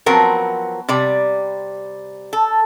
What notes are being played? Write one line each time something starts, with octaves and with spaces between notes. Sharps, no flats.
F3 F#3 B3 C4 A#4
C3 G3 D5
A4